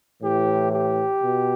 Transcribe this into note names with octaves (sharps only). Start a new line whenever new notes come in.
A2 E3 G4
G4
B2